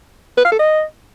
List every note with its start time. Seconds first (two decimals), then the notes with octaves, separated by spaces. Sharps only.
0.37 B4
0.45 F5
0.52 A4
0.59 D#5